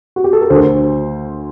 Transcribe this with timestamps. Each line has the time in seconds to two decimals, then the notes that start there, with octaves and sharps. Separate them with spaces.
0.16 F#4
0.24 G4
0.33 A4
0.41 A#4
0.50 D2 D3 C5